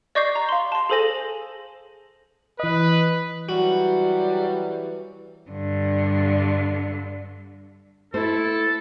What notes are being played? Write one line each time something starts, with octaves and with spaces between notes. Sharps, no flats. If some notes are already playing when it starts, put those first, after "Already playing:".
D5 D#5 C#6 D6 G6 C7
A#5
F5 C6
A5 C6
G#4 A4 C5 G#5 A#6 F#7
E3 B4 D#5
E3 F#3 G3 F#4
G2 D3
A3 E4 A4 C5